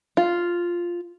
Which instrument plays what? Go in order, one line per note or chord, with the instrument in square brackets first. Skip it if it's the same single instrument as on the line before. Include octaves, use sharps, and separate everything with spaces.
[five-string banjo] F4